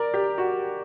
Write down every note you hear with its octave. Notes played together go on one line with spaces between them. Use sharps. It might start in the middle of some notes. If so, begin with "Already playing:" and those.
Already playing: A#4 D5
G4
F#4